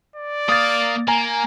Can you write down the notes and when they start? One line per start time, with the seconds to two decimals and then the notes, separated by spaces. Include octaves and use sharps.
0.16 D5
0.49 A#3 F5 D#6 A6
1.08 A#3 G#5 A#5